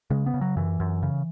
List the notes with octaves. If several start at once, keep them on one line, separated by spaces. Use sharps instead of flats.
C#3 G#3
B3
C#3
F#3
F#2 E3
F#2
C#3